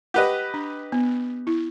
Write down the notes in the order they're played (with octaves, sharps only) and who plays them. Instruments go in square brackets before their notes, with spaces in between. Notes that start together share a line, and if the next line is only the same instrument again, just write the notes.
[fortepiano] G4 B4 D#5 [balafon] F#5
[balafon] D4
B3
E4